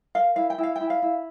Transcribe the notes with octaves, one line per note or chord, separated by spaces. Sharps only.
A#4 F5
E4 F5
G5
E4
F5
G5
E4
F5
E4